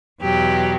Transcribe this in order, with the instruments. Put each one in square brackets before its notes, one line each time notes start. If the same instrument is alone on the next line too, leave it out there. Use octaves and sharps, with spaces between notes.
[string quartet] E2 B2 F#3 G4